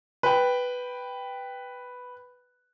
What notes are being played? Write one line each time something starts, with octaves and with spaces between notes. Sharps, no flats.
B4 G5